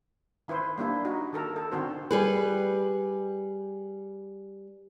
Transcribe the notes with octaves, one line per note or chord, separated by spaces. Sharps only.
D#3 E4 B4 C5
G3 A#3 D4 E4
D#4 F#4
D#3 A4 A#4
A4
D3 D#3 C4 F#4 C5
G3 G#4 B4